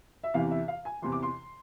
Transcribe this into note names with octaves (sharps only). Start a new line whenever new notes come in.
E5
E2 C3 E3 F5
E5
F5
G#5
E2 C3 E3 C6
D6
C6